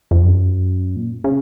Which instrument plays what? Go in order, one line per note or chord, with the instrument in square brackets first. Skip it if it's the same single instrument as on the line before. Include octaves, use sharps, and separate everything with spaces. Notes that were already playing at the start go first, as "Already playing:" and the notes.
[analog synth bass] F2
F#2
A#2
C#3